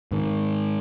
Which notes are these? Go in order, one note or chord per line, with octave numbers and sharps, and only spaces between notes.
G#2 D#3